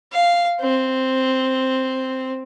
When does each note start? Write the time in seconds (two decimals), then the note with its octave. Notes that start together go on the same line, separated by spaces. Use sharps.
0.12 F5
0.61 C4